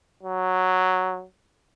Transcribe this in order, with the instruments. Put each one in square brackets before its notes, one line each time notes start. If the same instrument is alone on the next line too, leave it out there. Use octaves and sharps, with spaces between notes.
[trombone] F#3